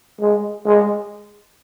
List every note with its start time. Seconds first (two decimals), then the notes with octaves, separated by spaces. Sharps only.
0.20 G#3
0.66 G#3